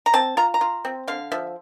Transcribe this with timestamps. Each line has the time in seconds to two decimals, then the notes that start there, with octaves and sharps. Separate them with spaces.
0.06 A#5
0.14 C4 A5
0.37 F4 A#5
0.54 A#5
0.61 F4
0.85 C4
1.08 D3 F5
1.32 F3 E5